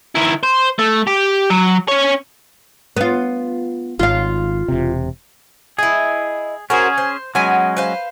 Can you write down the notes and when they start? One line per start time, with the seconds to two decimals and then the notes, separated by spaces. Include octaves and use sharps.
0.15 D#3 E4
0.43 C5
0.79 A3
1.07 G4
1.50 F#3
1.88 C#4 C#5
2.96 B3 F4
3.99 G#1 F4 F5
4.68 E1 C3
5.78 E4 G#4 D#5
6.70 C#4 F#4 G#4 A#4 C5
6.98 C5
7.35 F#3 G#3 B3 C#4 G#5
7.77 B4 C5 F5